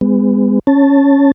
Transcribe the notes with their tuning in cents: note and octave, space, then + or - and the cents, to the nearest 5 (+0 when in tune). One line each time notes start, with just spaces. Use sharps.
G#3 -25 B3 +35
C#4 +0 A5 +0